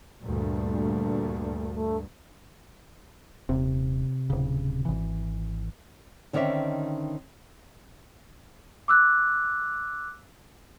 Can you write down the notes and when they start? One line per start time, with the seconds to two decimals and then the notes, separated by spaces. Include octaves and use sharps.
0.22 D2 G2 A#2 A3
1.74 A3
3.49 D#1 C3
4.30 D1 C#3
4.85 G#1 E3
6.33 D3 D#3 C4 C#4 D5 E5
8.88 D6 E6 F#6